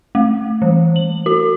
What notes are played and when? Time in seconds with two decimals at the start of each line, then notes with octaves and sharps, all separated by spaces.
0.15 A3
0.62 E3
0.96 F#7
1.26 F#4